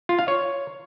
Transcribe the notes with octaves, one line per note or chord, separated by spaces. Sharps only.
F4
F5
C#5